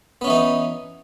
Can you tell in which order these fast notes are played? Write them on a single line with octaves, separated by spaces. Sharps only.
B3 C#4 E3 D#4